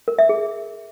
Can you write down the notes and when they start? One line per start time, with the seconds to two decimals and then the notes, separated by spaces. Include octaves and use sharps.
0.08 A#4
0.19 E5
0.29 G#4